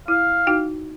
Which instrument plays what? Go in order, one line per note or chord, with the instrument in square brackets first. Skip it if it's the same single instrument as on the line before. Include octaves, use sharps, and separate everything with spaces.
[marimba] E4 [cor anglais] F5
[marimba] D#4 F#4 G5